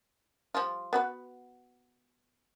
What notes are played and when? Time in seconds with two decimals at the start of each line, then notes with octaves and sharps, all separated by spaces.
0.55 F3 G3 F4
0.93 B3 F#4 B4